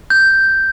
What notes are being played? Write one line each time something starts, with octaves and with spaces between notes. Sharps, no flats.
G6